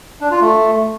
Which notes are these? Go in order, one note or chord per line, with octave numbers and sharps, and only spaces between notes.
D4
F4
A3